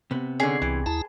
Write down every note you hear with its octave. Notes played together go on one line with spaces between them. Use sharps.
C3 B3
D3 C#4 G#4
C2 E3
D#2 E4 A5 A#5